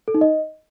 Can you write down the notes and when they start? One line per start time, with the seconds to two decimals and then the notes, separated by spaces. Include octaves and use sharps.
0.08 A4
0.14 D#4
0.21 D#5